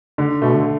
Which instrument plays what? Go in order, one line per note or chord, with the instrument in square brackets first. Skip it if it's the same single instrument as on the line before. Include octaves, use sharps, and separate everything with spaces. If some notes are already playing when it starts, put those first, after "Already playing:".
[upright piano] D3
[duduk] B2 [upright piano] A3
[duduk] D3